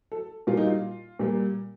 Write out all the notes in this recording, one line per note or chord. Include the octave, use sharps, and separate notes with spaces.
A4
A#2 G3 A#3 F4
D#4
F4
A#2 G3 A#3